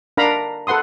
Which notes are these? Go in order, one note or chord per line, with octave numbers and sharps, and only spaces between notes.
D4 A#4 F5 A#5 B5
A4 B4 F#5 C6 D#6